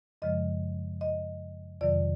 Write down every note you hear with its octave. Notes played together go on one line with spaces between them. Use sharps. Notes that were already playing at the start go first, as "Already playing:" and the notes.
F#2 C#3 F3 G#3 D#5
D#5
F2 C3 D#3 F#3 D5